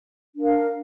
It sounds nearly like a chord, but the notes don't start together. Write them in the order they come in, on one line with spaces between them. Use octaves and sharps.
D4 A#4 F5